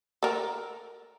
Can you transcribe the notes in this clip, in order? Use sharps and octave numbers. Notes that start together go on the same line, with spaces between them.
A4 A#4